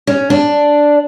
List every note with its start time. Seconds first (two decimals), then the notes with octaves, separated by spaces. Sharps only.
0.07 C#4
0.30 D4